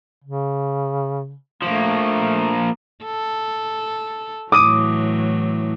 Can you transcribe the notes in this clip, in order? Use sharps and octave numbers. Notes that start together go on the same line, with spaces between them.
C#3
F3 A3 A#3
A4
A2 E3 F#3 D6 D#6 D#7